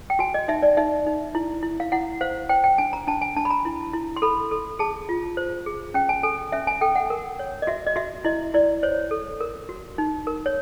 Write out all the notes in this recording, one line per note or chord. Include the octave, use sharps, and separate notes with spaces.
G5
F#4 G#5
D#5
D#4 E5
D5
D#4 E5
D#4
E4
E4
F5
E4 F#5
C5 F5
C5 G5
G5
D4 G#5
A#5
D4 A5
G#5
D4 A5
B5
A#5
E4
E4
C6
A4 B5
A4
G#4 A5
F4
C5
G#4
C#4 G5
G#5
A4 G#5
C#4 E5
G#5
A4 G5
F#5
A#4
C#5
D#5
F#4 E5
D#5
F#4 E5
E4 D#5
E4 D5
C5 C#5
A4
A#4
F#4
D#4
A#4
C#5